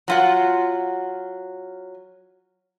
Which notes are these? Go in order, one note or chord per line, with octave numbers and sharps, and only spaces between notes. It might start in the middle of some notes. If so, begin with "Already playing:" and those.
F#3 F4 F#5